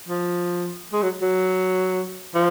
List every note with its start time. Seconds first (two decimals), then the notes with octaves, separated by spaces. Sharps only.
0.09 F3
0.93 G#3
1.02 F#3
1.22 F#3
2.34 F3